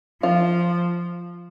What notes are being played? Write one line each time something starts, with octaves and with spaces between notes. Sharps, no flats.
F3 F4